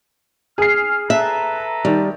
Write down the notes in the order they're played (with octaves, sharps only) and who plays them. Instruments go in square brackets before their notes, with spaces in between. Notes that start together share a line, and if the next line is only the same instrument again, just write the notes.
[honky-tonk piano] G#4 C7 [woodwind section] F6
[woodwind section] A4 B4 A#5 [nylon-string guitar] E5
[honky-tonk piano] D#3 [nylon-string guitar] G3